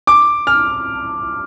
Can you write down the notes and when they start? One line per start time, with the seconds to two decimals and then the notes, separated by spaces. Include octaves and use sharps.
0.07 D6
0.47 F6